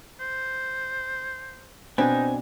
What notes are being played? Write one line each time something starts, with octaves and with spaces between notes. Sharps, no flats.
C5
B2 C4 D4 D#4 B4 G#5